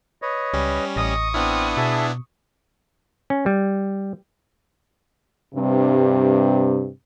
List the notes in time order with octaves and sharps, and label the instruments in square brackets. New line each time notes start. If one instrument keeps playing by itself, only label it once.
[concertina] B4 C#5 D#5
[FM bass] C#2 [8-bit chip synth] G3 C#4
[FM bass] A1 [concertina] D#5 [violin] C#6 D#6
[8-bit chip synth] B3 D4 E4 [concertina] C4 F6
[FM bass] B2 [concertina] G#4 E5 A5
[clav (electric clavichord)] C#4
G3
[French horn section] G2 C3